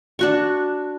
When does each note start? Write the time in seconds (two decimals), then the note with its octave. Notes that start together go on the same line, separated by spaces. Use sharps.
0.19 D4 F#4 C#6